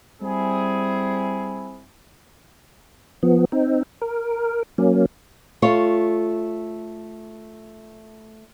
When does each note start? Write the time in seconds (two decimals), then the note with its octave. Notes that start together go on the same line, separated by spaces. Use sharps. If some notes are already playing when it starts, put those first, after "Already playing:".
0.21 G3 C4 E4 G#4
3.23 F3 B3
3.52 C4 D#4
4.02 A#4
4.78 F#3 A#3 C#4
5.62 A3 F4 C#5